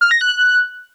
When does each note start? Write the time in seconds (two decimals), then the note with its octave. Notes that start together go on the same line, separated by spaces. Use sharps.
0.01 F6
0.11 A#6
0.21 F#6